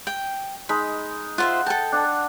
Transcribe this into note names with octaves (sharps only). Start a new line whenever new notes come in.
G5
G#3 D#4 B5
F4 C5 E5 F#5
A4 G5 A5
D4 F#5